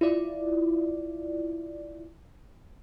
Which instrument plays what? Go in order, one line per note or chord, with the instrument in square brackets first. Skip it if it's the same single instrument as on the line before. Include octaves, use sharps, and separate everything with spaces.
[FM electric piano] E4 F4 D5